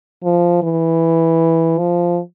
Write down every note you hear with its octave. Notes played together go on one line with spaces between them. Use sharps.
F3
E3
F3